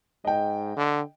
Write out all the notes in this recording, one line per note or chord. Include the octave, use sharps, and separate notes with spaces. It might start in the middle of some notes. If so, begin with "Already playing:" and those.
G#2 D#5 G5
D3